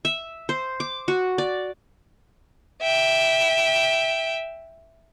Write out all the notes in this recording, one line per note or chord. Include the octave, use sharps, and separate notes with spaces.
E5
C5
D6
F#4
D5
E5 G5